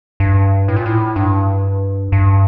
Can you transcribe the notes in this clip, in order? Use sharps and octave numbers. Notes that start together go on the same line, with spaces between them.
G2
A2
A#2
A2
G2
G2